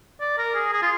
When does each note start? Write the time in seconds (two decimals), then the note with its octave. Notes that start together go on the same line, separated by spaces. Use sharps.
0.20 D5
0.38 A#4
0.55 G#4
0.72 G#4
0.82 F4